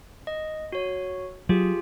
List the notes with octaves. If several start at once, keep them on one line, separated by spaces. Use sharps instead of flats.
D#5
F#4 C#5
F#3 F4 G4 G#4